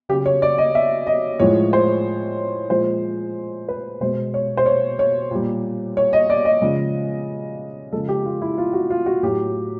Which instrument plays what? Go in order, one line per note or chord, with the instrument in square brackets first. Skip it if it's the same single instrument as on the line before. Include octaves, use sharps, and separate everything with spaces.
[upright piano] C#3 G4
F#3
C#5
D5
D#5
E5
D#5
A2 F3 G#3 C#5
C5
A#2 F3 G#3 C5
B4
B2 G#3 C5
C#5
C5
C#5
C#5
A#2 G3
C#5
D#5
D5
D#5
C#3 F3 G#3
C#3 F3 G#3 A4
G4
F4
E4
F4
F#4
F4
F#4
A2 F#3 G4